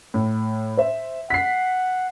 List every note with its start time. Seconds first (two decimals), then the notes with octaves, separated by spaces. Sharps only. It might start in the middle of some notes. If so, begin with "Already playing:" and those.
0.14 A2
0.77 C5 E5
1.30 F#5 B6 C7